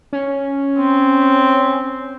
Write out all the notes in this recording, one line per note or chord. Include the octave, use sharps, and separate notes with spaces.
C#4
C4